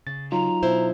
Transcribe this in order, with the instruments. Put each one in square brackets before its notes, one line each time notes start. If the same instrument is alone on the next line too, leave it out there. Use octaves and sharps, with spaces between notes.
[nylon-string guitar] C#3 [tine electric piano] A6
[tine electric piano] F#3 D#4 F4 [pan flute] A#5
[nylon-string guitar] B2 E4 C5